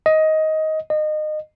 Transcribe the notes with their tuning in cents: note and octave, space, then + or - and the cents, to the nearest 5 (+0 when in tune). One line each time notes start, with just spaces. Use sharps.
D#5 +15
D#5 -25